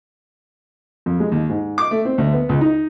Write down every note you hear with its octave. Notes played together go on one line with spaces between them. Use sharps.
F2
G#3
D#2
G#2
D6
A3
C4
D2
B3
C#2
D#4